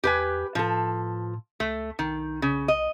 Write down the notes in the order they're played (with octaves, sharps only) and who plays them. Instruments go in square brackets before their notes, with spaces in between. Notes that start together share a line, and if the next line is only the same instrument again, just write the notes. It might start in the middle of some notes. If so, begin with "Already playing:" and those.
[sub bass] E2 [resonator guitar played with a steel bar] G4 B4 G#5
[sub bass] A2 [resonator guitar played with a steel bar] F3 A4
[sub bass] C#2 [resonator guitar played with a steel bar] A3
[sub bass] B1 [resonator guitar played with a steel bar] D#3
[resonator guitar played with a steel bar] C#3
D#5